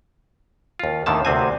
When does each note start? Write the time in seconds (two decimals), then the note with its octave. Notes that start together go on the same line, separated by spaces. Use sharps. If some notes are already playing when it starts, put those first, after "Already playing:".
0.79 D#2 F4
1.06 D#2 A2 D3 D#3 A5
1.25 D2 C3 C4 G#5